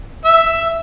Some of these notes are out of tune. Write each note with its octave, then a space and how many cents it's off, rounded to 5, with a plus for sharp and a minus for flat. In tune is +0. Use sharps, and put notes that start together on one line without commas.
E5 +5